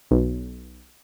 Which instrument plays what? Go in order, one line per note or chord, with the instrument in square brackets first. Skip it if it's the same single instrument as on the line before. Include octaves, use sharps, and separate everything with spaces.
[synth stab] B1